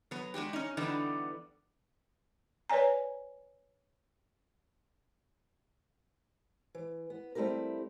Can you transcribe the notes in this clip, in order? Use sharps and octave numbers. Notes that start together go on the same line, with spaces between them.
F#3 B3
G#3 D4 F#4 G4
C#4 D#4
D3 E3 G3 B3 D4 D#4
B4 C#5 D5 G#5 A#5
E3
B3
G3 A3 C4 E4 G4 A#4